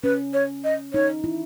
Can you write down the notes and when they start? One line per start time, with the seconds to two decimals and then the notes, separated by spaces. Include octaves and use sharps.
0.04 C#4 B4
0.33 C#5
0.64 D#5
0.93 D#4 C#5
1.24 E4